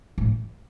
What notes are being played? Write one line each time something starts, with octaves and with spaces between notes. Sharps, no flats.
A2